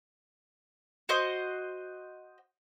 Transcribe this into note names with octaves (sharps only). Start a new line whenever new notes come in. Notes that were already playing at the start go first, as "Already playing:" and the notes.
F#4 C5 D#5